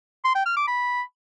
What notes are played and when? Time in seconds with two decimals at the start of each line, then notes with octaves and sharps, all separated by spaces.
0.25 C6
0.35 G5
0.46 F6
0.57 D6
0.68 B5